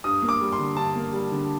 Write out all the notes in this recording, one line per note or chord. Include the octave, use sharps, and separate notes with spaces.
G2 D#6
A#3
D6
G3
C6
D3
G2 A5
A#3
G3
D3